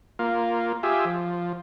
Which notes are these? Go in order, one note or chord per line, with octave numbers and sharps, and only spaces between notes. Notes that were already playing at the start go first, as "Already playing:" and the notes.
A#3 F4
F4 G4 G#4 E5
F3